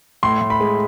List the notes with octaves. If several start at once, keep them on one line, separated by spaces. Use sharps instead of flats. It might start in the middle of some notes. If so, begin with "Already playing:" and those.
A2 C6
A2
B5
G#3